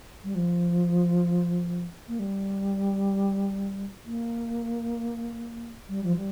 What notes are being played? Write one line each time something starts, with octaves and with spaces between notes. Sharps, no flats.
G3
F3
A#3
G3
A#3
G3
F3
G3